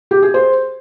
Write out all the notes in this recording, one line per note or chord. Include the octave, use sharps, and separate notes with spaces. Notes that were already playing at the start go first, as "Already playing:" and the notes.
G4
G#4
C5